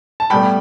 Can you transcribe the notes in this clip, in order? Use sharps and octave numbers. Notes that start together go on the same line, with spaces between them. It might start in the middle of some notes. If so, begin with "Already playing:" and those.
A5
A2 G3 B3 G5 B5